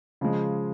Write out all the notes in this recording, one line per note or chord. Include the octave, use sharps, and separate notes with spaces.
C#3 F3 G#3